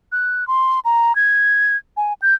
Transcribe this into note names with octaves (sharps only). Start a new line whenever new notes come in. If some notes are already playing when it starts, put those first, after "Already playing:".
F#6
C6
A#5
G#6
G#5
G6